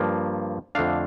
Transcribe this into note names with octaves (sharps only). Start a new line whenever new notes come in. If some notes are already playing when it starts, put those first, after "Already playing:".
Already playing: G2 F3 A#3
F2 D3 A3 D4 F5